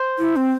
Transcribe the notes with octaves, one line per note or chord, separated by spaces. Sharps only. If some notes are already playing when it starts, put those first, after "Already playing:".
Already playing: C5
E4
C4